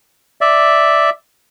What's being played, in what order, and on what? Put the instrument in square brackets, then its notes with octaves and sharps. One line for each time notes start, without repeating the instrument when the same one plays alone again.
[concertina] D5 E5